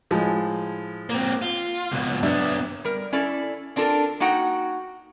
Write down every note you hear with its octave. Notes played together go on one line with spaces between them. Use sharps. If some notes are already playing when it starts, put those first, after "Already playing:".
A2 F3 G#3
A#3 C4
F4
C#2 B2
F#2 B3 D4 E5
G3 A#4
C#4 E4 A4 D5
C4 D4 F4 A4 A#4
A#3 D#4 F#4 F#5 G5